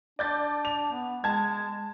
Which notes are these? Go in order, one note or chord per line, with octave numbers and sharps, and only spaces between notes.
D4 D5 G6 A6
F7
B3
G#3 A5 G#6